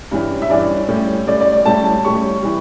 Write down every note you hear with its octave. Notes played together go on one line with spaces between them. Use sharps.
G2 E3 G3 C#4
E5
G2 E3 G3 C#4 D5
A2 G3 C#4
A2 G3 C#4 D5
D5
D5
A2 G3 C#4 A5
A5
A2 G3 C#4 C#6
E3 G3